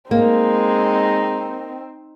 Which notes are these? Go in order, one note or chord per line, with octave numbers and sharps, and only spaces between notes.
G#3 A#3 C4 D#4